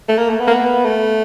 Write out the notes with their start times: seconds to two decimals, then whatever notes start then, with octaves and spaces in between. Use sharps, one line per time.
0.09 A3
0.18 A#3
0.30 A3
0.40 B3
0.47 A#3
0.51 B3
0.85 A3